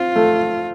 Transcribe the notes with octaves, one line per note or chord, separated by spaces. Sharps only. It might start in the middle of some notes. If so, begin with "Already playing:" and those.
Already playing: C4 F4
A3